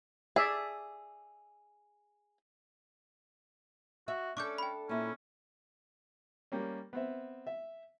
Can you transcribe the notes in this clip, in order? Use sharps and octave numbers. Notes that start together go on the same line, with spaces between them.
G#4 D5 E5
F#4 E5
C#4 D4 A4 C#6 D6 G6
G5 B5
A#2 C#4 E4
G3 A#3 C#4
B3 C4 E5
E5